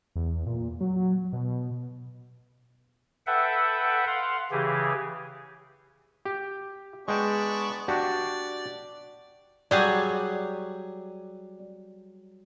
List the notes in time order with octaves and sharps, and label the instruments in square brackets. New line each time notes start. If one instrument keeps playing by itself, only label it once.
[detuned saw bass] E2
A#2
F#3
B2
[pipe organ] A4 B4 E5 F#5 G5
F5 F#5 C6
C#3 E3 G4 G#4
[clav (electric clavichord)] G4
[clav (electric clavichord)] G#3 G5 [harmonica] B3 D4 C#6
[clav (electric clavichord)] D4 F#4 G4 [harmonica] D5
[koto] F#3 G3 G#4 [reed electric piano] D5